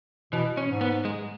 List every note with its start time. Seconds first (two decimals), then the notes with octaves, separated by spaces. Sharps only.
0.33 B2 E3
0.57 C#4
0.69 G#2
0.81 B3
1.05 G#3